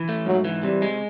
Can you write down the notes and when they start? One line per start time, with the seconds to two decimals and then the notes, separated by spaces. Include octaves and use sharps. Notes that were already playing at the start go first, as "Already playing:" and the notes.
Already playing: E3
0.09 A3
0.26 G#2 F#3
0.45 E3
0.63 C3 G3
0.82 G#3